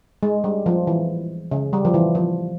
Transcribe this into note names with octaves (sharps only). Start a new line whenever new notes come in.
G#3
G3
F3
E3
C#3
G3
F3
E3
F3